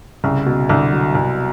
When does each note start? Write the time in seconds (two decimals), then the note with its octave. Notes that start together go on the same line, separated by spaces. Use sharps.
0.24 C2 C#3
0.46 B2
0.69 C2 D3
0.92 F#3
1.15 C2